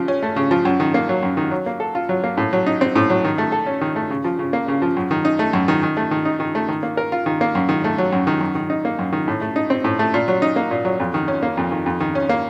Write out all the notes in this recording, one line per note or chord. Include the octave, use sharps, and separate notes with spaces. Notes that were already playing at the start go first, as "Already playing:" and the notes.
Already playing: C#3 F3
C#4
A3
C#3
F3
F#2
D#3
A#3
F#3
F#2
D#3
F#3
A#3
A4
F4
F#3
A#3
A2
F#3
D#4
C4
A2
F#3
D#3
A3
A4
C#4
D#3
A3
C#3
F3
C#3
A#3
C#3
F3
F#2
D#3
D#4
A3
F#2
D#3
D#3
A3
D#3
D#4
D#3
A3
D#3
A#3
A#4
F4
D#3
A#3
F#2
D#3
A3
F#3
F#2
D#3
F#2
D#3
D#4
A#3
F#2
D#3
A2
A3
D#4
C4
A2
A3
A#2
F#3
D#4
A#3
A#2
F#3
F2
D#3
C#4
A#3
F2
D#3
F2
D#3
C#4
A#3